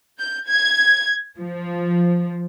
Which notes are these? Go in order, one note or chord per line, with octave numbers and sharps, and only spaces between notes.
G6
G#6
F3